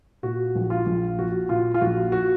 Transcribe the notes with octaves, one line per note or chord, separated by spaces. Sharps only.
A#2 F#4
A#1
F4
A#1
F3 F#4
A#2 F4
F4
A#1 F#4
F#4